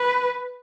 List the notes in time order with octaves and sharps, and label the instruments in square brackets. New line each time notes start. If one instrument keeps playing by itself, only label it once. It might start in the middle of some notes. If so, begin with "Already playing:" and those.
Already playing: [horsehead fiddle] B4